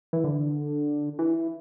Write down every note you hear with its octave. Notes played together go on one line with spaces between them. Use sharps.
E3
D3
E3